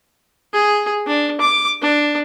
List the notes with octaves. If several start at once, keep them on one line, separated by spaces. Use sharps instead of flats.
G#4
D4
D6
D4